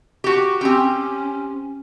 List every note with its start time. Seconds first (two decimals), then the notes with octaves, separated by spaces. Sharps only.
0.24 F#4 G4
0.61 C4 C#4 G4